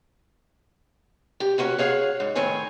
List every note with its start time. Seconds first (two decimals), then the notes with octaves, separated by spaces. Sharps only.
1.40 G4
1.58 A#3 C#4 F#4 F#5
1.78 G#4 C#5 F5 F#5
2.20 G#2
2.35 A2 D#3 C4 C#4 C#5 G#5